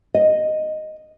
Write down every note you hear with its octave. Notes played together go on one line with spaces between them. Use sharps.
D#5